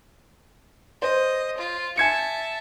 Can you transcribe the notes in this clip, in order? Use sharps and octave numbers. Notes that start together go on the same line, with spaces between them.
C5 D#5
F4
E5 G#5 A5 G#6 C#7